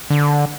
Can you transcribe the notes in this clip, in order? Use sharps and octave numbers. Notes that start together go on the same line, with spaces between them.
D3